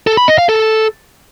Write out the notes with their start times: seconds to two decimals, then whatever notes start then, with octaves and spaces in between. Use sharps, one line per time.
0.07 A4
0.17 B5
0.28 D#5
0.38 F5
0.49 A4